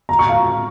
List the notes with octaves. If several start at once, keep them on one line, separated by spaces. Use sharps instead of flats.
A#5
C#6
F5 A#5